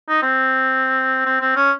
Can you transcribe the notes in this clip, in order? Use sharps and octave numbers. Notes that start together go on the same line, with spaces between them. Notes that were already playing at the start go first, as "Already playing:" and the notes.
D#4
C4
C4
C4
C#4